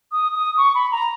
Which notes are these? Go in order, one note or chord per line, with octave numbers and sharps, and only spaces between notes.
D#6
D#6
C#6
B5
A#5